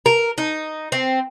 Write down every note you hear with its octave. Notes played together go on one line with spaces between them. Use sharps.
A#4
D#4
C4